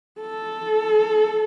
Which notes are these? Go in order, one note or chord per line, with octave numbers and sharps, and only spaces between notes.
A4